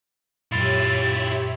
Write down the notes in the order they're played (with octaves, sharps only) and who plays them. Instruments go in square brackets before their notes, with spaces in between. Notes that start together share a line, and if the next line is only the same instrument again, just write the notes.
[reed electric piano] F#2 A#2 [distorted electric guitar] E4 F4 [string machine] G4 C#5 E5 [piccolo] A6